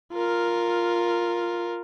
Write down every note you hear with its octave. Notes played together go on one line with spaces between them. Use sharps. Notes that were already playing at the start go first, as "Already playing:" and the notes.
F4 A#4